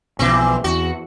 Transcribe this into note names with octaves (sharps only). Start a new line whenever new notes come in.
B1 B2 E3 F3 C4
E2 F#4